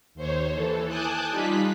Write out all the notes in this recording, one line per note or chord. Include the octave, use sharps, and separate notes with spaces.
D#2 C5 C#5
E3 A4
G#5 A5 D6 D#6 F#6 G6
G3 D#4 F4 F#6 B6